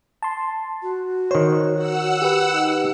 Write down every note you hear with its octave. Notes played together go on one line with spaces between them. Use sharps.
A5 C6
F#4
D#3 C5 C#5
F#5 E6
G4 B4
D#4